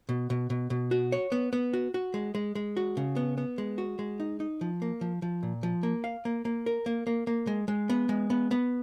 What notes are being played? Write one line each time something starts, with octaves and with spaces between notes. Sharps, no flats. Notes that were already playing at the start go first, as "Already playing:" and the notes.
B2
B2
B2
B2
F#4
C#5
B3
B3
F#4
F#4
G#3
G#3
G#3
F#4
C#3
B3
B3
G#3
F#4
G#3
D#4
D#4
F3
A#3
F3
F3
A#2
F3
A#3
F5
A#3
A#3
A#4
A#3
A#3
A#3
G#3
G#3
B3
G#3
B3
B3